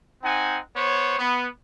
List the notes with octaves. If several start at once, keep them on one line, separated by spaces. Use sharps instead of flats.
C4 D#4 F#5 G#5
B3 C5 C#5
B3